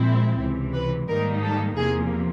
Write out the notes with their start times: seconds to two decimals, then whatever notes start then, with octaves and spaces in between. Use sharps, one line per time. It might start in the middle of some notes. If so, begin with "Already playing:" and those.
Already playing: A#2 F3 G#3 C4 E4
0.40 C#2 C3 E3
0.73 B4
1.08 G#2 D#3 G3 A#3 D#4 A#4
1.43 A4
1.76 E2 C3 F3 A#3 G#4